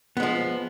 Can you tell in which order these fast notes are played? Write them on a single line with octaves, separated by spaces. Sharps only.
B3 G#3 F3